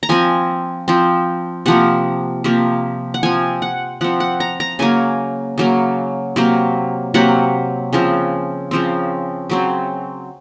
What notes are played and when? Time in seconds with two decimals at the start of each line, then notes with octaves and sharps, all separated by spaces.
0.03 A#5
0.09 F3 C4 G#5
0.88 F3 C4
1.66 C3 F3 A#3 F#5
2.44 C3 F3 A#3
3.14 F#5
3.23 F3 C4 G#5
3.62 F#5
4.01 F3 C4 F#5
4.20 F#5
4.40 A#5
4.60 A#5
4.79 C#3 F#3 A#3 G#5
5.58 C#3 F#3 A#3
6.36 C3 F#3 A#3
7.14 C3 F#3 A#3 F#5
7.93 C#3 F3 C4
8.71 C#3 F3 C4
9.50 C#3 F#3 C4